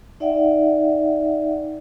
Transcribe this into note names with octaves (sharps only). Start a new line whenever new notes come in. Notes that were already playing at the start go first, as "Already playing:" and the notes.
D#4 D5 E5 F#5 G5